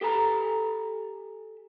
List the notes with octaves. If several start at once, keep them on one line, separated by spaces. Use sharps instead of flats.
G4 A4 G#5 A#5